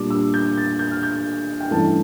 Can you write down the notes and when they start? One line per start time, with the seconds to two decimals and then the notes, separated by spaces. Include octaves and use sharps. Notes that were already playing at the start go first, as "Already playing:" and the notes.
Already playing: A#2 G3 D4 D6
0.10 E6
0.34 G6
0.58 A6
0.79 G6
0.91 F6
1.03 G6
1.60 G5
1.71 G2 E3 A3 C#4 A5